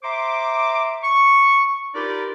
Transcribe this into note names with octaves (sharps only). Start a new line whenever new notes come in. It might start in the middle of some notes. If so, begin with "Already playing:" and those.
C5 E5 A#5 C6 D6
C#6
D#4 F4 G4 A#4 B4 D5